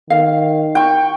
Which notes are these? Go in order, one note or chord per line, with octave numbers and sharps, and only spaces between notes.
D#3 F5
G5 C#6